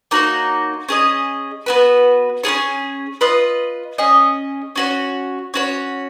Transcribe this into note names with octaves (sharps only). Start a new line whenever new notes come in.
A#3 D#4 F#4 C#5
C#4 G#4 D#5
B3 F#4 B4
C#4 F4 G#4 C#5
F4 B4 D#5
C#4 G#4 D#5
C#4 F#4 C#5
C#4 F#4 C#5